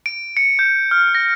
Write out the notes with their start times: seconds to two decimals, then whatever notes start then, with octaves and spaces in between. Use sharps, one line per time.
0.06 D7
0.37 C#7
0.59 G6
0.91 F6
1.15 A#6